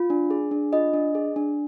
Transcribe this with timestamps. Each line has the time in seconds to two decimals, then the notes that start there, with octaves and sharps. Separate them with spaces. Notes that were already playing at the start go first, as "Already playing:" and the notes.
Already playing: F4
0.10 D4
0.31 G#4
0.51 D4
0.73 F4 D#5
0.94 D4
1.15 G#4
1.36 D4